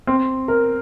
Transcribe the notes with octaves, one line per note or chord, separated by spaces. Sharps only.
C4
A#4